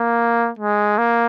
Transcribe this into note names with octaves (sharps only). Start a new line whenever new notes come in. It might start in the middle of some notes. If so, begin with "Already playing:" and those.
Already playing: A#3
G#3
A#3